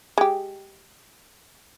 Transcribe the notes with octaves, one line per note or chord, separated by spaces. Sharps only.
G#3 G4